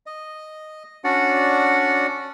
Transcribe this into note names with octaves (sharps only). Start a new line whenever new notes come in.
D#5
C#4 D4 F#4 D5 F#5